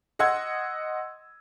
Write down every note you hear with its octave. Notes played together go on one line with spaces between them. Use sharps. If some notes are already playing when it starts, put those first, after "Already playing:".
D#5 F#5 C6 E6 G#6